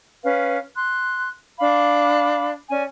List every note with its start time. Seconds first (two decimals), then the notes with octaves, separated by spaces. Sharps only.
0.23 C#4 B4 F5
0.76 C6 F#6
1.59 D4 F5 B5 D6
2.69 C#4 D5 G#5